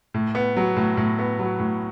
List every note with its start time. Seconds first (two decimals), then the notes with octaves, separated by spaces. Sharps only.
0.14 A2
0.35 B3
0.57 F#3
0.76 A2
0.97 A2
1.19 B3
1.39 F#3
1.60 A2